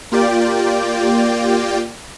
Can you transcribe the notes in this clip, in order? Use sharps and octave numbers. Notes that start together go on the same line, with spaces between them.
A#3 F4 G4 D5 G5